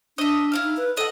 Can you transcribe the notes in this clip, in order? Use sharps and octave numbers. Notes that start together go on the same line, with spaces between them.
D4 D#5 E5
E4 F5 F6
D#4
B4
A4 D#5 F#5